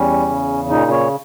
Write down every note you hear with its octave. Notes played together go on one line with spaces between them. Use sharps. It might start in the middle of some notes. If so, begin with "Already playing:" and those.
Already playing: E2 G3 C#4
C#3
A#2 D#4
C#5